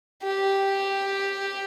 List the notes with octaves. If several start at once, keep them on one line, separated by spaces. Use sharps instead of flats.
G4